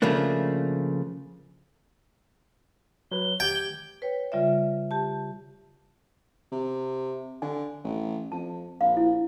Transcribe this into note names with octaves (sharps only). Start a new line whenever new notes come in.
C#3 F3 A3 A#3 D4
F#3 B4 G7
G4 G5 G#6
B4 C#5 G5
C#3 G3 F4 D5 E5
G4 A5
C3
D3 G#5
A1
F2 A5
A#1 F5
E4